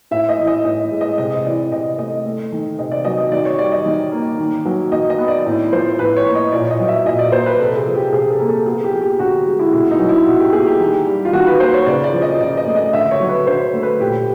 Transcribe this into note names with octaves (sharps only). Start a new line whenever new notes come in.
A2 E5
D#5
E3
D#5
A2 D#5
G#3
D#5
C3 D#5
E3 D5
C3 D#5
A3 D#5
A3
D#3
C3 D#5
D5
F#3 D#5
D#5
D#3 D5
C#5
G3 D5
D#5
D#3
A#3
D#3
F#3
D#3 D#5
D#5
B3
D5
A2
F3 C5
A2 B4
C#5
A#3
D#5
A#2 D5
D#5
F#3
E5
A#2 D#5
D5
A#3 C5
B4
C3 A4
G#4
F3
G4
C3 G#4
A4
A#3
A4
B3 G#4
G4
F3
G4
D3 F#4
G#3
E4
B2 E4
D#4
F#3
E4
B2
G4
A#3 G#4
G4
D#3
G3
F4
D#3 F#4
B4
A#3 C5
C#5
C#3 D5
D5
F3
D#5
C#3 D5
D#5
A3
D#5
D3 E5
C#5
F#3
B4
D3 C5
A3
B4
A#2 G4